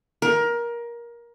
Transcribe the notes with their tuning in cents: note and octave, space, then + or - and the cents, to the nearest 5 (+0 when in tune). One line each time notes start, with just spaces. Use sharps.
A#4 +20